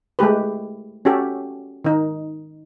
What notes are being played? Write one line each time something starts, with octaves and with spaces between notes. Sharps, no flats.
G#3 A3 G4 B4
C#4 F#4 G4 A4
D#3 D#4